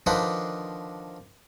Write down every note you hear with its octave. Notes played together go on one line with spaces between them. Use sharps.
D3 D#3 F3 D4 D#4 B4